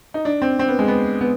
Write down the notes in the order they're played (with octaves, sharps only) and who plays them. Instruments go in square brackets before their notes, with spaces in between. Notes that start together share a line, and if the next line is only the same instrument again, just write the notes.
[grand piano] D#4
D4
C4
C4
B3
G#3
B3
B3